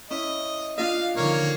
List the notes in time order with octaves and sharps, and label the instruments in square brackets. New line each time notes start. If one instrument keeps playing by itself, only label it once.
[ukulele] C#4 E4 [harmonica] D#5
[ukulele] D4 F4 D#5 [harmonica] F5
[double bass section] D3 D#3 F3 [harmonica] A#3 C#5